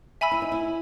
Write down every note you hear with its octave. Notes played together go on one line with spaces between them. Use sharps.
E5 G#5 B5 E6
E4
D#4
E4